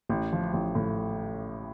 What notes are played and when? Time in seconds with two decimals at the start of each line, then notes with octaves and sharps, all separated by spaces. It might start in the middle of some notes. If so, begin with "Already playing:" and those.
0.09 A1
0.33 F3
0.54 A1
0.75 A2